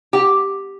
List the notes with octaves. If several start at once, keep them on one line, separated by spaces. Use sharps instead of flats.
G4